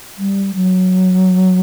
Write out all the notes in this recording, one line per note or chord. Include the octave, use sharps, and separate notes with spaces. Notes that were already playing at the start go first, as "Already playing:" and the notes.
G3
F#3